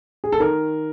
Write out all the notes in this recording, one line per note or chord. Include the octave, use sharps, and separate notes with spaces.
G#4
A4
D#3 A#4